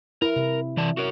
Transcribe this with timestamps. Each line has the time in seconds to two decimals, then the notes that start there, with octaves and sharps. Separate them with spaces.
0.22 E4 A#4
0.36 C3
0.77 E3 D5 A5
0.97 F#4 A#4 C#5